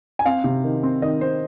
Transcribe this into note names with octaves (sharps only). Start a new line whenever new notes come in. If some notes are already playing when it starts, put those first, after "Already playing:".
G#5
C4 F5
C3
D#3
C4
D#3 D#5
C4 C5